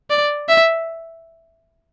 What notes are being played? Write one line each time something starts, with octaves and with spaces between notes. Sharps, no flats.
D5
E5